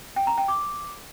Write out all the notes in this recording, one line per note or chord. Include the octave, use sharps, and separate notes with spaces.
G5
A#5
G5
D6